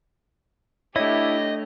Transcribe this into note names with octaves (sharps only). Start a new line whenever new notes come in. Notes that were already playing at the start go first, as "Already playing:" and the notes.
A3 D4 E4 G4 C#5 D#5